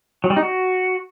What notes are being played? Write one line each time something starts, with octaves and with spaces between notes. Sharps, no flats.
F#3
G3
D#4
F#4